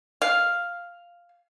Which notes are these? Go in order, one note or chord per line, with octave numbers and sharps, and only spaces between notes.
F5